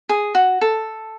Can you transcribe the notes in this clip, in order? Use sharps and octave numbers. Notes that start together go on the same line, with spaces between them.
G#4
F#4
A4